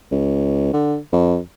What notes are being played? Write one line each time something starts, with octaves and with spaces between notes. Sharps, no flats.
C#2
D3
F2